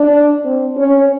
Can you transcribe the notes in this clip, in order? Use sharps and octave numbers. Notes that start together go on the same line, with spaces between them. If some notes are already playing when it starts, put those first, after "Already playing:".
Already playing: D4
C4
C#4